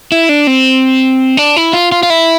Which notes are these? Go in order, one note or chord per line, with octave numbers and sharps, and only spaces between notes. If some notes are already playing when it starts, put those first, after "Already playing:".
E4
D4
C4
D4
E4
F4
F4
F4
E4